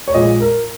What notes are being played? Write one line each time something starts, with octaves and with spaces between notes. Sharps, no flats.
C#5
A#1 A#2 G#3 D#5
A#4